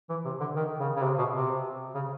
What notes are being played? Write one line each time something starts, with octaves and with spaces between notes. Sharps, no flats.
E3
C3
D3
D#3
C#3
C#3
C3
B2
C3
C#3